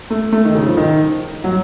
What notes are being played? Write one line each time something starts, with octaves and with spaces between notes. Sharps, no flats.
A3
A3
D#3
C#3
F3
D#3
F#3